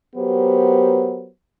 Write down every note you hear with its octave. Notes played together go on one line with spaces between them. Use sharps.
F#3 B3 G4 A#4 C5